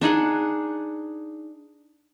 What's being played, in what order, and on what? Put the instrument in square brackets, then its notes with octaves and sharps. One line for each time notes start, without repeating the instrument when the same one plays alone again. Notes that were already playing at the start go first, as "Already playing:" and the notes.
[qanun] D4 D#4 G#4 F#5